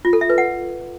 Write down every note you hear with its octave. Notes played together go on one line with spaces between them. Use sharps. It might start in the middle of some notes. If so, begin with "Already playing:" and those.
F4
A4
E5
B4
F#5